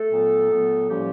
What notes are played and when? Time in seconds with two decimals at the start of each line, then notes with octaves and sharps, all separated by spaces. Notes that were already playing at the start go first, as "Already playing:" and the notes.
Already playing: A3 A4
0.10 A#2 F#3 B3
0.50 A#2 F#3 B3
0.89 A2 F3 G3 A#3 C#4 G4